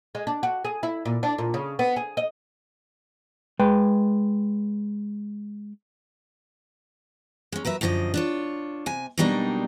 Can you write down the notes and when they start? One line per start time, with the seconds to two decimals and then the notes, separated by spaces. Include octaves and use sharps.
0.15 G#3
0.27 D4
0.43 F#4
0.64 G#4
0.83 E4
1.05 A#2
1.23 D4
1.38 A#2
1.54 C#3
1.79 B3
1.96 G#4
2.17 D#5
3.59 G#3 B4 G5
7.52 G#3 C#4
7.65 F#3 A#4 B4 E5
7.81 F#2 D3 F3 G4 D#5
8.14 D4 F4 C#5
8.86 C3 G#5
9.18 B2 F#3 G3 A#3 D4 D#4